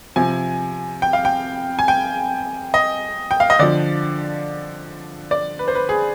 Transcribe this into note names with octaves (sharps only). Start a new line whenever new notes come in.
C3 F3 G#5
G5
F5
G5
G#5
G5
D#5
G5
F5
D#5
D3 F3 D5
D5
B4
C5
B4
G#4